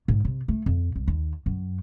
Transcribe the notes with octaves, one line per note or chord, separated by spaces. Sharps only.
G#2
C3
A3
F2
C2
D#2
F#2